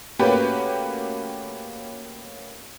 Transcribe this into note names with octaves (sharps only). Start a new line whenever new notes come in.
A3 A#3 C#4 F#4 G4 B4